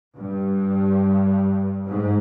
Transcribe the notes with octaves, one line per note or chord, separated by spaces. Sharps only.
G2
G#2